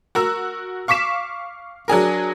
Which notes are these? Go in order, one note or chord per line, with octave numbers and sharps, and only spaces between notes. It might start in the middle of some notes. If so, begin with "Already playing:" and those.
F#4 A#4 E6
F5 C#6 D6 B6 E7
F#3 D4 G#4 A#4